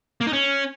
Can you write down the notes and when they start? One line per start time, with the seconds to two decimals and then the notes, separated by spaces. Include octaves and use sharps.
0.21 A#3
0.27 D#4
0.33 C#4